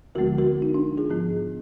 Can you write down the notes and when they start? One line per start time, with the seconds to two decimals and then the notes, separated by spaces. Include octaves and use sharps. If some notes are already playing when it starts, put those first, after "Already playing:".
0.15 D2 D3 F3 G#3 B3 F#4 A#4
0.38 F#4 A#4
0.62 D#4
0.74 D4
0.97 F4 G#4
1.10 G#2 F3 B3